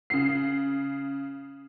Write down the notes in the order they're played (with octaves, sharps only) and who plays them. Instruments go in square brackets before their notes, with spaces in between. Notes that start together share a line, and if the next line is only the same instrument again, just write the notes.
[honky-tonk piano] C#3 C7